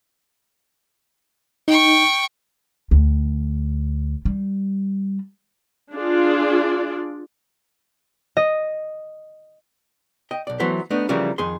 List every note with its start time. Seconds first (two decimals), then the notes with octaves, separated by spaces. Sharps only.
1.68 D#4 G5 C#6
2.91 D2
4.25 G3
5.93 D4 F4 G#4 D5
8.37 D#5
10.31 D#5 G5
10.47 B1 D5
10.60 E3 F#3 A3 B3 C5
10.90 A3 B3 D4 D#4
11.09 C#3 E3 F3 G3 A#3 C#4
11.38 F2 D#3 G#4 C6